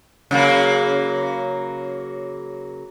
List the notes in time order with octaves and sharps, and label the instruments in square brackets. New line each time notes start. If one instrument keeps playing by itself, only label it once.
[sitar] C#3 F#3 A#3